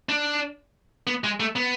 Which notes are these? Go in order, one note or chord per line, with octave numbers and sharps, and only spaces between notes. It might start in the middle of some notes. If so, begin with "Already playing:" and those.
D4
B3
G#3
A3
B3